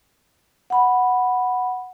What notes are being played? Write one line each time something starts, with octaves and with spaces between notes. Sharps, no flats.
F#5 B5